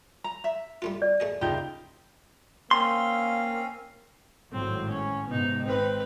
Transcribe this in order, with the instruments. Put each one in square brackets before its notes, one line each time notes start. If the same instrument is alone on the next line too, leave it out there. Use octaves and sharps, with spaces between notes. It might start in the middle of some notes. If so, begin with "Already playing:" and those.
[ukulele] A#5
E5
[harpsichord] G3 A3 F4
[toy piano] D5
[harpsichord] A3 G#4 D#5
[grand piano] F#1 D#4 G6 [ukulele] F4 G4
[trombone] A#3 [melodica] C4 C#4 F5 [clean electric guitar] C6
[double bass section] G#1 A2 F#3 [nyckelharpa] C4
[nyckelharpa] C#4
[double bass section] G#2 C3 [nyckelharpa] B3 D#4
[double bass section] G#1 C4 [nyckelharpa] D#4 B4